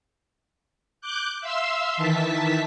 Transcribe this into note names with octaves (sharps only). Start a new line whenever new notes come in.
D6 F#6 G6
E5 F5 C6 E6
D#3 E3 E5 A5 B6